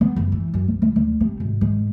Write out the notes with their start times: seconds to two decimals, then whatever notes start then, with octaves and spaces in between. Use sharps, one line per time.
0.01 B3
0.16 F#1
0.32 E3
0.54 F#2
0.68 B1
0.82 D2
0.96 D2
1.20 C3
1.40 G#1
1.61 G#2